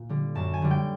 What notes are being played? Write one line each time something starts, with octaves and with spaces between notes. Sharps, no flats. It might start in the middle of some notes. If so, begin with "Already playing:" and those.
Already playing: A#2
D3 G3
F#2 A5
G#5
D3 G3
G5